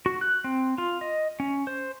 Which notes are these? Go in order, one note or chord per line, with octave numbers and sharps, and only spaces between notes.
F#4
F#6
C4
F4
D#5
C#4
C5